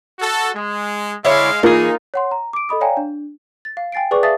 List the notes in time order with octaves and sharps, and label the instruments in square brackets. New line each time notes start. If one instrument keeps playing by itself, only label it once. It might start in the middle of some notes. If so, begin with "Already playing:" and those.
[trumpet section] F#4 A4
G#3
[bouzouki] D3 E4 C#5 [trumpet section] G#3 F5
[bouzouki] E3 G#4 [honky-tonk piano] A#3 F4 A#4 [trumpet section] D#4
[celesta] C#5 F#5 C6
A#5
D6 D7
A4 D#5 B5 D#6
C#5 D5 F5 G5 G#5 A#5
D4
[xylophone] A6
F5
G5 G#5 A6 C7 D7
G#4 B4 D5 C#6 D6
E5 F5 A5 D#6 A6